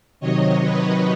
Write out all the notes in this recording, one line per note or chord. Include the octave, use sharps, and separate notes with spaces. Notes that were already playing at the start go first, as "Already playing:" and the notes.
C3 D#3 F#3 C#5 D#5
B4 C#5